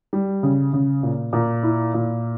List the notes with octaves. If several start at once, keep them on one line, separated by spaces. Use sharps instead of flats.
G3
C#3
C#3
A#2
A#2
E4
A#2